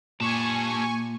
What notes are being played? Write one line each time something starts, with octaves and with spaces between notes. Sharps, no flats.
A#2 G4 G#5 A5 C#6